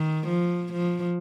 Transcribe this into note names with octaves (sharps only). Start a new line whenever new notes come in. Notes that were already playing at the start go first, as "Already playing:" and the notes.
Already playing: D#3
F3
F3